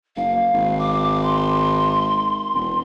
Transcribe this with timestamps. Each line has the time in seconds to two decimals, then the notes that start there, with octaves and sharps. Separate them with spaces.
0.16 F#1 F5
0.54 G#1
0.79 D6
1.23 C6
2.54 E1